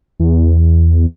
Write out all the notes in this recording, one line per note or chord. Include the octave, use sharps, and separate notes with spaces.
E2